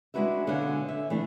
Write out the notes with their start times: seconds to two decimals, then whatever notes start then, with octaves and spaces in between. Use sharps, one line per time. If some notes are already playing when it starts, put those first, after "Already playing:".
0.14 G#3 D4 E4 F#4 B4 E5
0.47 B2 D3 C#5 F5 F#5 G#5
0.89 E5
1.10 E3 A3 D4